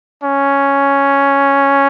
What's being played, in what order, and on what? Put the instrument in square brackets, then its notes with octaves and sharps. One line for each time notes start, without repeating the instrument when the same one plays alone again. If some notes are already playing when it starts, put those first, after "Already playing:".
[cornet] C#4